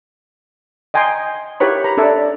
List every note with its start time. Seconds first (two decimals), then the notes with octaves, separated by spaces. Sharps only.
0.94 D#5 G5 G#5 A#5 C6 D#6
1.60 E4 G4 A#4 B4 C#5 B5
1.84 A#5 B5
1.97 D4 A4 D5 E5